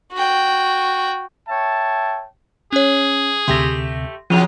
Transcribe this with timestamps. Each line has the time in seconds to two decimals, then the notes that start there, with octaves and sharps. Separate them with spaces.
0.13 F#4 G5
1.48 C#5 E5 G5 A5
2.73 C#4 G#4 C#5
3.48 D2 C3 A3 G4 C6 A#6
4.30 C3 F3 F#3 G#3 D#7 F7